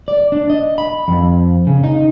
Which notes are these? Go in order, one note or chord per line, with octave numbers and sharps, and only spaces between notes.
D5
D4
D#5
B5
F2
C#3
D#4